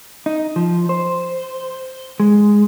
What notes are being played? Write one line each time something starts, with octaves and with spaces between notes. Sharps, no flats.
D#4
F3
C5
G#3